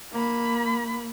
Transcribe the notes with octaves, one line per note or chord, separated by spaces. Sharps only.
A#3 B5